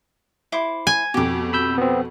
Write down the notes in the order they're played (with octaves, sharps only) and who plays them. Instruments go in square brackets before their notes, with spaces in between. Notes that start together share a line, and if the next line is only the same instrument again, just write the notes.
[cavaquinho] E4 C5 D6
[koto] G#5
[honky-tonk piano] F2 B2 [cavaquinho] G4 D6
[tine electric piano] B5 E6 G6
B3 C4